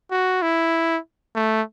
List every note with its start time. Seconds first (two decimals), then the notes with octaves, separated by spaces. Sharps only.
0.11 F#4
0.42 E4
1.35 A3